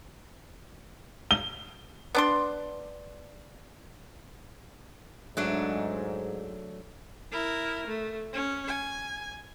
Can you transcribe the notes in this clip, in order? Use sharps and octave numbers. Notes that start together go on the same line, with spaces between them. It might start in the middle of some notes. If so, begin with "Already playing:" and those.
G7
B3 D4 C6
G#2 F#3 A3 D4
E4 A#4
A3
C#4
G#5